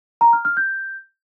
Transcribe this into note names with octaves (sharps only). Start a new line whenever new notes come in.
A#5
F6
F6
G6